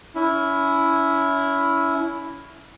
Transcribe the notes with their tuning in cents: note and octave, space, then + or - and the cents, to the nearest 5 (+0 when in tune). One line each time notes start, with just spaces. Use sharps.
C#4 +30 E4 +0